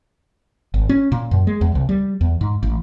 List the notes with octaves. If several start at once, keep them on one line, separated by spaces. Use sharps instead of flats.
G#1
C#4
A#2
F#2
G#3
E2
C2
G3
E2
G#2
A1